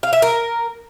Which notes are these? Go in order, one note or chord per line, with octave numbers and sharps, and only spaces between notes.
F5
E5
A#4